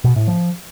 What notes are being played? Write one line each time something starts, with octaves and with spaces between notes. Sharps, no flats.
B2
A2
F3